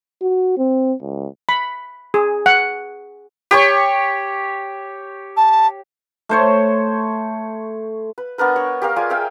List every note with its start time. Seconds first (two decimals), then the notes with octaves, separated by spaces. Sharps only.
0.22 F#4
0.57 C4
1.01 C#2
1.49 B5
2.14 G#4
2.46 F#5
3.51 G4 C#5 C#6
5.37 A5
6.29 A3 C5 C#5
8.18 B4
8.38 B3 D4 A#4 B4
8.56 C#5 C#6
8.82 G4 A#4 F5
8.96 F4 G#4 D5 G#5
9.10 G#4 E5 F5 G5